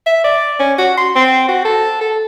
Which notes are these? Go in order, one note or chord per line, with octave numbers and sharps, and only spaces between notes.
E5
D5
C#4
F#4
C6
C4
F#4
A4
A4